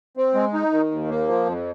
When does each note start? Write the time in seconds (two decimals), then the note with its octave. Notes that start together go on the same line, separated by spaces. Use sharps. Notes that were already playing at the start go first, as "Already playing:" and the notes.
0.17 C4
0.34 G#3
0.53 D#4
0.72 D#3
0.91 D#2
1.10 A#3
1.28 F3
1.46 F2